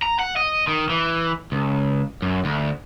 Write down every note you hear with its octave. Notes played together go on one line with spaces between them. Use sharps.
A#5
F#5
D#5
D#3
E3
C#2
F#2
D2